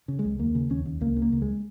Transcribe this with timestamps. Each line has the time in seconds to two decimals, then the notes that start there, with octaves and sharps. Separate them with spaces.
0.08 C#3
0.19 G#3
0.25 C#2
0.39 D#2 A#3
0.55 C#3
0.70 D#2 C#4
0.86 D#2
1.01 C#2 A#3
1.16 C#3
1.22 A#3
1.32 C#2
1.42 G#3